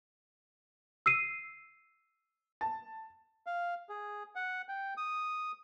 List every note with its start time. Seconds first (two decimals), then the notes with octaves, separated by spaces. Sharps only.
1.06 E6 C7 D#7
2.61 A5
3.46 F5
3.89 G#4
4.35 F#5
4.68 G5
4.97 D#6